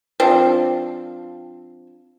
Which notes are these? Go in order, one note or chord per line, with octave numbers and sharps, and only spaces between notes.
F3 C4 D4